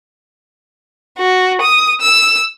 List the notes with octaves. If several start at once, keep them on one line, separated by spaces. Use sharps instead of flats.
F#4
D#6
E6